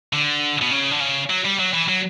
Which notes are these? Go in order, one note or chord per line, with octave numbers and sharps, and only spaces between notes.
D3
B2
C#3
D3
C#3
F#3
G3
F#3
E3
F#3